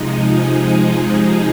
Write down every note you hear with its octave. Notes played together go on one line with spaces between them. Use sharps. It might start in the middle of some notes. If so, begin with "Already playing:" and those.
Already playing: C3 F3 G#3 D#4
G#3 G#4